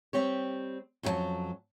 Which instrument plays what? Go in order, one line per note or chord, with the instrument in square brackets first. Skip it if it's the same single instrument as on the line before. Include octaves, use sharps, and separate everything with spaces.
[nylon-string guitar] G3 C4 G4 C#5
F2 F#3 C#4 E4 A5